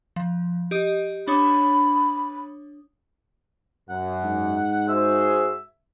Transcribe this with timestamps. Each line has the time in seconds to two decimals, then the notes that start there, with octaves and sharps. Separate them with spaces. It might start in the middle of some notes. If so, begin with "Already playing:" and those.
0.16 F3
0.71 G4 D#5 D#6
1.28 D4 C#5 B5 D#6
3.90 F#2 F#5
4.24 G#2
4.89 F#4 G#4 C5 E5